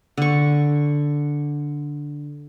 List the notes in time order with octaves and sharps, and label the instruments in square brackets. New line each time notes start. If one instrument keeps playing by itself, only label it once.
[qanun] D3 C#6